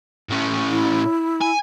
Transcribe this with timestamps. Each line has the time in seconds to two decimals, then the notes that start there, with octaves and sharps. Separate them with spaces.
0.29 A2 C#4
0.70 E4
1.42 G#5